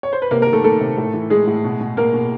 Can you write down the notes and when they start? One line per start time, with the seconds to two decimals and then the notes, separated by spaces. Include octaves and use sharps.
0.03 C#5
0.13 C5
0.22 B4
0.31 C3 A#3 A#4
0.42 A#3 A#4
0.47 D#3
0.53 A3 A4
0.64 D#3 A3 A4
0.81 C3
0.97 A2
1.14 E3
1.30 E3 G#3 G#4
1.47 A2
1.64 B2
1.81 B2
1.97 B2 A#3 A#4
2.14 B2